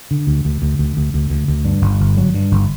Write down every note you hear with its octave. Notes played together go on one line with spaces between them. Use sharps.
D3
D2
D2
D2
D2
D2
D2
D2
D2
G2
G1
G1
F#3
G2
G1